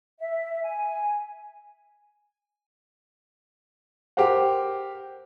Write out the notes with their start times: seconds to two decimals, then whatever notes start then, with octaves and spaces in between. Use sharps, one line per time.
0.19 E5
0.63 G#5
4.17 G4 A#4 C5 F#5